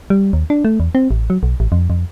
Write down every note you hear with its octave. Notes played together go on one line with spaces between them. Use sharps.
G3
D#2
D4
A3
E2
C4
A1
F#3
B1
A1
F2
F2